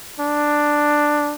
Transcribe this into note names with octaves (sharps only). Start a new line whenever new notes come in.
D4